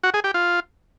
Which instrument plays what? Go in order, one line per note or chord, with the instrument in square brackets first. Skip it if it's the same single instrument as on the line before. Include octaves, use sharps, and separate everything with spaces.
[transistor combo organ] F#4
G#4
G4
F4